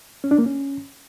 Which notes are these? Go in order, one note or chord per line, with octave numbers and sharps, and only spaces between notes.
C#4
D4
A#3
C#4